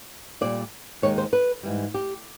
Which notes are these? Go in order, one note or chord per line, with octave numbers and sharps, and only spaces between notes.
A#2 G3 D5
D#2 D#3 G#3 C#5
C5
B4
G#2 E3 G3
G4